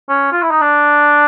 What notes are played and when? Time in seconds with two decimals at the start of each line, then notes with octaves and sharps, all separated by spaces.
0.09 C#4
0.33 F4
0.42 E4
0.51 D#4
0.61 D4